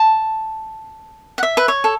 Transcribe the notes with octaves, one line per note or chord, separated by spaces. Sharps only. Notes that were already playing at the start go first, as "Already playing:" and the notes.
Already playing: A5
F#5
E5
B4
C#5
A4